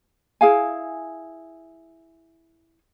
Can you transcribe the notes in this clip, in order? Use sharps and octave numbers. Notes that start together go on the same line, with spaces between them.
E4 G#4 F5 G#5